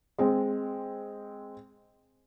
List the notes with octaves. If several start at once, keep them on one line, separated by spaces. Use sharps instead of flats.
G#3 C4